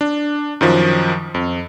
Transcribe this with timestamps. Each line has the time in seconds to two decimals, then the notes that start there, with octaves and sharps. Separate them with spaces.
0.01 D4
0.61 F#2 D#3 F3
1.34 F2